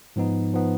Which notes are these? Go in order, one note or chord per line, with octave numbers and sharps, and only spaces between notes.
G#2 F3 B3 D#4
F3 B3 D#4